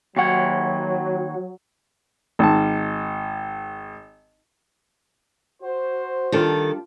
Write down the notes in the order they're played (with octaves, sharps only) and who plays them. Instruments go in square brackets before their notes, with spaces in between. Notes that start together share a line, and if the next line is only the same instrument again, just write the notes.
[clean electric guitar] D#2 F#5 [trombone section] F#3 [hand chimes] G5 C#6 G#6
[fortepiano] G#1 A5
[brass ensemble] F#4 C5
[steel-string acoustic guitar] D#3 A4 [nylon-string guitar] G3 D4 F4